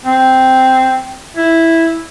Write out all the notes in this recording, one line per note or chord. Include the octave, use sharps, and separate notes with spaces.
C4
E4